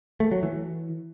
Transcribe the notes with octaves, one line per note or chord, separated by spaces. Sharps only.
A3
F#3
E3